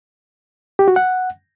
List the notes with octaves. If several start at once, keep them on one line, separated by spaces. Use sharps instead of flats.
G4
F#4
F#5